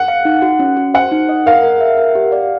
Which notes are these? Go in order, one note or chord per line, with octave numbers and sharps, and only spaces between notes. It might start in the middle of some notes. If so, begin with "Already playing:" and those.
Already playing: F#5
F5
D#4
F#4
C#4
F#4
C5 F#5
D#4
D#5
A#4 F5
A#4
E5
A#4
G4
D5